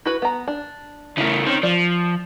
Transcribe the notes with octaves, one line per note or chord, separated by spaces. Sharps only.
E4 F#4 B4
B3 A#5
D4
C#3 A3 E4 A#4
D#3 C4 C#4
F3 D5